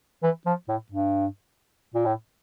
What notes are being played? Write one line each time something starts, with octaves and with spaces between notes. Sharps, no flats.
E3
F3
A2
G2
A#2
A2